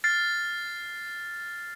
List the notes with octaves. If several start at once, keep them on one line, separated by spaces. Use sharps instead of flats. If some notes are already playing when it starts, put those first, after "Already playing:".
F6 A6 C7